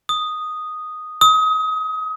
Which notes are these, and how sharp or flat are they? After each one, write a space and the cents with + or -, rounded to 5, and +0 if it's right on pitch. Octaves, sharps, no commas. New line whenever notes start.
D#6 -5
D#6 +30